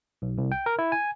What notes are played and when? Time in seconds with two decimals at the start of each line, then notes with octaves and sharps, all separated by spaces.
0.22 B1
0.38 C2
0.52 G5
0.66 A#4
0.79 E4
0.92 G#5